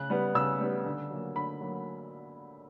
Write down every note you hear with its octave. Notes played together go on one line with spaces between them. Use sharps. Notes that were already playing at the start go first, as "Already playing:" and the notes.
Already playing: C#3 F#6
G3 B3
C#3 E6
G3 B3
D3
F#3 A#3
D3 B5
F#3 A#3